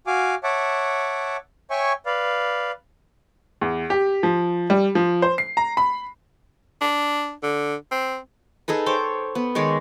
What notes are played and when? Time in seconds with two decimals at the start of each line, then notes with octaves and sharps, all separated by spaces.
0.07 F#4 F5 G#5 D6
0.43 C#5 E5 F#5 A5 D6
1.70 C#5 E5 G5 G#5 C#6
2.06 B4 D5 F5
3.61 E2
3.90 G4
4.23 F3
4.70 G3
4.95 F3
5.22 C5
5.38 C7
5.57 A#5
5.77 B5
6.82 D4
7.43 D3
7.92 C4
8.68 D#4 G#4 A4 B4
8.86 C5 C#5 G5 D6
9.35 B3
9.55 D#3 G#3 C#5 D5